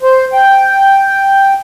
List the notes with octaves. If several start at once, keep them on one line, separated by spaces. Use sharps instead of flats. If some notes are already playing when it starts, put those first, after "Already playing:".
C5
G5